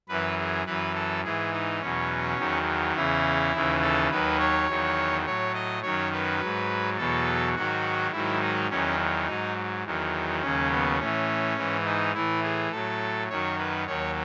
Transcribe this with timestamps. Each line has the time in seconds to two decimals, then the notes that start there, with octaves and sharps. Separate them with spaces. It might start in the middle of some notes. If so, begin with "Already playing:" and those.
0.09 F#2 E3 B4
0.38 G#4
0.66 F#2 E3 B4
0.95 A4
1.24 G#2 E3 G#4
1.53 D#4
1.81 E2 B2 F#3 C#4
2.38 E2 D#3 F#3
2.96 E2 C#3 E3 E4
3.53 D#2 C#3 E3
3.82 A4
4.11 D#2 D#3 F#3 B4
4.39 C#5
4.68 E2 D#3 F#3
5.25 A2 F#3 C#5
5.54 D#5
5.82 F#2 D#3 F#3 C#5
6.12 B4
6.40 G#2 F#3
6.97 E2 B2 F#3 A4
7.55 G#2 D#3 F#3 F#4
8.12 G#2 D#3 F#3 E4
8.41 D#4
8.70 E2 D#3 F#3 C#4
9.27 G#2 F#3 D#4
9.84 E2 D#3 F#3
10.42 D#2 C#3 F#3 C#4
10.71 B3
10.99 A2 E3 C#4
11.57 G#2 E3
11.85 D#4
12.14 A2 E3 E4
12.43 G#4
12.71 A2 F#3 A4
13.29 F#2 D#3 F#3 C#5
13.58 B4
13.86 D#2 D#3 F#3 C#5